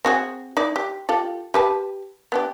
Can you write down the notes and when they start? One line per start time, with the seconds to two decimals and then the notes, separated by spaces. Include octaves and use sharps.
0.05 C4 F#4 G#4
0.57 D#4 E4 D5
0.76 G4
1.09 F4 G4 A4
1.54 G4 B4 A5
2.32 B3 D4 G4